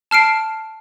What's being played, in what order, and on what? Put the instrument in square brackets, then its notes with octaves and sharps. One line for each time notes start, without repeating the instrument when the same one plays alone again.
[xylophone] A5 F6 C7 D7